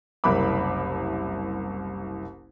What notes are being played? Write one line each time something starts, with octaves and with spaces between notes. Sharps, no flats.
F#1 C2 A#4 E5 B5 D6